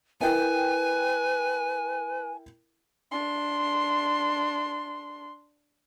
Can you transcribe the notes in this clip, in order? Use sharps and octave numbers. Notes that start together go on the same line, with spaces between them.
E4 A#4 B4 G5 G#5
D4 C6